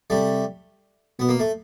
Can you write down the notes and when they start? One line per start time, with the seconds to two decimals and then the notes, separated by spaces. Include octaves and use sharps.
0.10 C3 G3 A3
1.19 B2 B3
1.29 A#3
1.40 A3